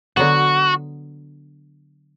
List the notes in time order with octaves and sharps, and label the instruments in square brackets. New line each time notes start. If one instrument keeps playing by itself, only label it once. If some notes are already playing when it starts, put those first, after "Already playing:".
[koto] D3 F#3 B3 [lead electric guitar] F#4